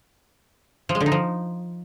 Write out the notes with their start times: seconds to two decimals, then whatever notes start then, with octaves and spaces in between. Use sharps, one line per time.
0.89 F3
0.95 G#3
1.00 D3
1.06 D#4
1.12 F3